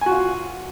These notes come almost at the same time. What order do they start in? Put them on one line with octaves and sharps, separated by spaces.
G#5 F#4 F4